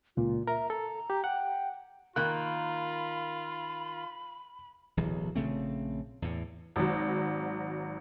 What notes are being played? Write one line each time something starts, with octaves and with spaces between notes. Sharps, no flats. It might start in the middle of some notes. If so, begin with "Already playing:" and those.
C#2 A#2 F4
A#4 E5 A#5
A4 A#5
G4
F#5 G5
D#3 A#3 F4 B5 F#6
D1 B1 E3
A#1 C#3 A3 C4
E2 A2
G#1 G#2 F#3